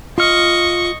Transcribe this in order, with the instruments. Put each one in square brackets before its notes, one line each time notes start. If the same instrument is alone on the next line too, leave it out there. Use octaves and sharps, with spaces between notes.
[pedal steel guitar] F4 F6 [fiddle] D#5 C#6